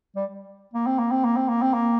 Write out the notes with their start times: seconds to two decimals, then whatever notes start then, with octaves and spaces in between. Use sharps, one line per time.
0.16 G3
0.74 A#3
0.86 C4
0.99 A#3
1.11 C4
1.24 A#3
1.37 C4
1.49 A#3
1.62 C4
1.73 A#3